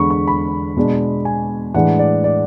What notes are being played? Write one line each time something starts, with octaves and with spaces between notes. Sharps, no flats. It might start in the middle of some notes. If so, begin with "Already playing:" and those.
Already playing: E2 D3 G#3 B5 C#6
C#6
B5
B2 G#3 D4
G#5
A2 E3 G#3 D4 F#5
D5
D5